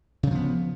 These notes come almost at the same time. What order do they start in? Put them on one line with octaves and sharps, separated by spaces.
C#3 F#3 F3 B3